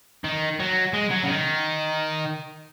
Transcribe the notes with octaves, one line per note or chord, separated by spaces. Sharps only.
D#3
F#3
G#3
F#3
C#3
D#3